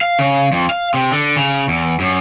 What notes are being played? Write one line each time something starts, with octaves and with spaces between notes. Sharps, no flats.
F5
C#3
F2
F5
C3
D3
C#3
E2
F#2